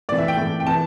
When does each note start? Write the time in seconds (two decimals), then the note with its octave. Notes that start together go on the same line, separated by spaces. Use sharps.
0.09 A2 E3 D5
0.18 E5
0.28 G5
0.37 A2 E3
0.60 G5
0.67 E3 A5